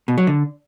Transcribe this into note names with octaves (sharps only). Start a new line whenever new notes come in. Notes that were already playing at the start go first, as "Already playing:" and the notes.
B2
F#3
D3